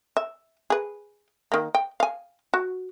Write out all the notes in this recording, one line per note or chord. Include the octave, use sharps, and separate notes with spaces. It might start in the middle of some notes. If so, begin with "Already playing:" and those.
E5
G#4 B4
D#3 A#3
G5
F5 G#5
F#4